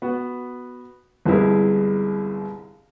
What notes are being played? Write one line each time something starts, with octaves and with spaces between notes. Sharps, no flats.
B3 F#4
G1 C2 G#3 E4 G#4 A#4